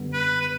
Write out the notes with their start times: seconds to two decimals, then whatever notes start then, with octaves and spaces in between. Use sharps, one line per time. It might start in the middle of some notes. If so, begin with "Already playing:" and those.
Already playing: F#2 D3 G3 B3
0.13 B4
0.41 B4